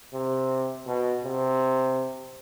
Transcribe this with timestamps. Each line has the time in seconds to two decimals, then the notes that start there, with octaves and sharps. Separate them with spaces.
0.13 C3
0.87 B2
1.24 C3